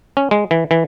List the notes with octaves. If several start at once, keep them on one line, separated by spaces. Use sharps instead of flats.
C#4
G#3
E3
E3